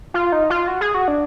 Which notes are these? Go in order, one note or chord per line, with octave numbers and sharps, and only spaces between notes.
F4
D#4
F4
F#4
G#4
F#4
D4